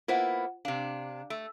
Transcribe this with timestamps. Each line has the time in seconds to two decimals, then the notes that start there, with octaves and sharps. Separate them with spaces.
0.08 A#3 B3 E4 F4 C5 F#5
0.65 C3 D4 F5
1.30 A3